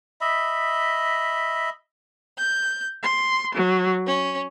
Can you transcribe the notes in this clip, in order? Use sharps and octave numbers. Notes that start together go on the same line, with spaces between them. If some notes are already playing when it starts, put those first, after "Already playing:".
D#5 E5 B5
G6
C6
F#3
C#4